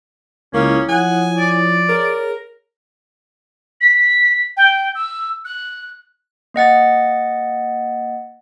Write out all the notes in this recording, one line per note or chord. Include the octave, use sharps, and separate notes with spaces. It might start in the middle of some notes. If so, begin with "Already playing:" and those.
C#2 A#3 C#4 E4 C#5 D#6
F3 F#5 G#5
D5
G#4 A#4 C#5
B6
G5
E6
F#6
A#3 D#5 F#5 A6